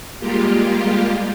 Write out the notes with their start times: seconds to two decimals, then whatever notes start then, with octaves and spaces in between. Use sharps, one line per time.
0.19 G3 G#3 A#3 F4 G4